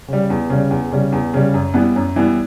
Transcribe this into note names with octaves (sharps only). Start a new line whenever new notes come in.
C#3 G3
E2
C#3 G3
E2
C#3 G3
E2
C#3 G3
F#2
E3 G3 B3
F#2
E3 G3 B3